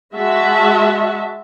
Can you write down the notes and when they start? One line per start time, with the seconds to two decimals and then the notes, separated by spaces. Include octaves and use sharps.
0.14 G#3 F#4 E5 A5